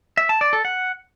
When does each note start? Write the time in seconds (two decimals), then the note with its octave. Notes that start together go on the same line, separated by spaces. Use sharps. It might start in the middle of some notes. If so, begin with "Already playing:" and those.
0.17 E5
0.29 A5
0.41 D5
0.53 A4
0.65 F#5